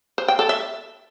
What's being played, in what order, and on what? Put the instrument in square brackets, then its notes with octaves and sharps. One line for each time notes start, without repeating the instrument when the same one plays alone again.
[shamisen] C5
G5
A4
E5